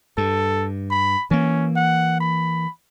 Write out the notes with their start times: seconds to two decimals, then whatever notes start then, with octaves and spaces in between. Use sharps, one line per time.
0.18 G2 A4
0.91 B5
1.31 E3 A#3 C#4
1.76 F#5
2.20 B5